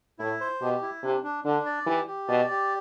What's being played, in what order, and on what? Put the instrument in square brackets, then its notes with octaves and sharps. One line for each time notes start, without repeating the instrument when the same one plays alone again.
[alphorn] A2 [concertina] E4
[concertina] C5
[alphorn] B2 [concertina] G4
[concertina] E4
[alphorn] C3 [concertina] D4
[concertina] D4
[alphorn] D3 [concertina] D4
[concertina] D5
[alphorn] E3 [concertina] G4
[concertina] G4
[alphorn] B2 [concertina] D5
[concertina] G4